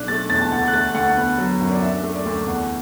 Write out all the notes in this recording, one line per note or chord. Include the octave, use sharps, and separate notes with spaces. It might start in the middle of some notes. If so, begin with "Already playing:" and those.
Already playing: B1 D4 F#6
A3 A6
E2 A6
A5
D2 F#5
F#6
A3 A6
D2 F#5
B3
F#3
F#2
D5
D4 E5
A3
D5
D2
E2 F#5